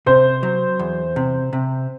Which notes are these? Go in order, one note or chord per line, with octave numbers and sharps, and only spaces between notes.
C3 C5
F#3
E2
C3
C3